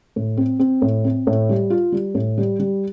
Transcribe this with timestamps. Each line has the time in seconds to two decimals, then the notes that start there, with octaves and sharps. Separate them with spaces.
0.16 A2
0.37 C4
0.59 C4
0.82 A2
1.04 C4
1.27 A2
1.49 G3
1.70 F4
1.92 G3
2.15 A2
2.38 G3
2.59 G3